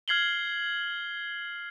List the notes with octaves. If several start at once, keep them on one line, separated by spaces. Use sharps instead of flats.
F6 G#6 C7 F#7 G7